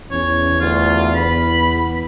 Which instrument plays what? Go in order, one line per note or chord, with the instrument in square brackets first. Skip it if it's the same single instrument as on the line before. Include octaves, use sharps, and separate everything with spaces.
[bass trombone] E2 [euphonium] C#4 [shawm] C#5
[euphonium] D2 [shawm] F4
[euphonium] B3 [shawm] B5